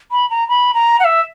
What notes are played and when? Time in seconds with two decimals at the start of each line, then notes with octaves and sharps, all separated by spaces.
0.12 B5
0.30 A#5
0.49 B5
0.74 A#5
1.00 F#5
1.04 E5